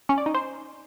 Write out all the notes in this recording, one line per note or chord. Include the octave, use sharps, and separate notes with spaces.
C#4
D5
D#4
C5